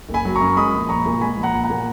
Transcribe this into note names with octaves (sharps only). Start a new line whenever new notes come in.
F#1
G#5 B5
F#3
A#5 C#6
F#2
G#3 B5 D#6
A#1
A#1 A#5 C#6
A#2
G#3 G#5 B5
A#1
F#5 A#5
A#1
F#5 A#5
A#2